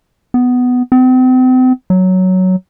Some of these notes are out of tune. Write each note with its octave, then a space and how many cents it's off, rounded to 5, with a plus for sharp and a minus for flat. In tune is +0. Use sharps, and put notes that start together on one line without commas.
B3 +10
C4 -40
F#3 +5